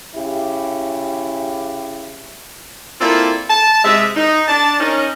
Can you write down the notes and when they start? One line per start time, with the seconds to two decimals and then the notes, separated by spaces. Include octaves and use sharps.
0.16 C#3 E4 G4
3.01 A#3 C4 E4 F4 A4 D5
3.50 A5
3.84 C3 G#3 D#5 E5
4.16 D#4
4.48 D4 A5
4.80 C#4 D#4 A#4